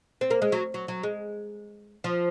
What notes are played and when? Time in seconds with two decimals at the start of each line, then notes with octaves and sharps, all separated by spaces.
0.21 C4
0.31 A#3
0.42 G#3
0.52 F#3
0.74 F#3
0.88 F#3
1.03 G#3
2.04 F3